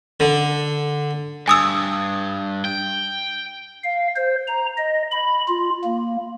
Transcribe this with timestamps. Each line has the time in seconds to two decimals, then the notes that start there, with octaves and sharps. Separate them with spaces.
0.20 D3
1.48 G2 G#5 D#6 E6
2.65 G5
3.84 F5
4.16 C5
4.47 A#5
4.78 D#5
5.11 B5
5.48 F4
5.84 A#3